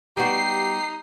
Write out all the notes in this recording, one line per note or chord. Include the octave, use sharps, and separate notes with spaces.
G3 B3 D#4 F#4 G4 C7